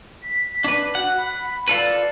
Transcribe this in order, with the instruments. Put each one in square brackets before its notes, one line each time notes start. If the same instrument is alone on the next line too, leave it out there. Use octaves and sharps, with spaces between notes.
[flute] B6
[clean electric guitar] D4 B4
[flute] F#4 [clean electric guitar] F#5
[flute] B5
[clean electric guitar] F4 A4 B4 [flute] D5